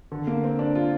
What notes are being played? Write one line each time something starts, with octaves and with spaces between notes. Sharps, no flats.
D3
A#3
C4
D4
F4